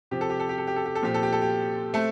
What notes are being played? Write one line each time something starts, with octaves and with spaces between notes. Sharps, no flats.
C3 F3 C4 G4
A4
G4
A4
G4
A4
G4
A4
G4
A4
A#2 F3 C4 G4
A4
G4
A4
G4
A3 C4 A4